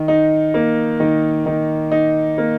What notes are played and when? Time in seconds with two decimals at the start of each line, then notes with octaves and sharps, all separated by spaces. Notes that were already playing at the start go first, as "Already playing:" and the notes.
Already playing: D#3
0.08 D#4
0.54 A#3
1.00 D#3
1.46 D#3
1.91 D#4
2.38 A#3